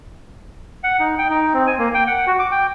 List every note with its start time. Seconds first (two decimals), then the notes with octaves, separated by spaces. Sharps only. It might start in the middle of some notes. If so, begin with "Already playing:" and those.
0.84 F#5
1.00 D#4
1.18 G5
1.30 D#4
1.54 C4
1.67 G#5
1.78 A#3
1.94 G5
2.07 F#5
2.27 F#4
2.39 D6
2.52 G5